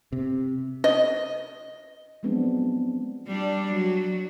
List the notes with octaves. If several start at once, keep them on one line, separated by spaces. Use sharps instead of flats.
C3
D#5
F3 F#3 G#3 B3 C4 D4
G3 D4
F#3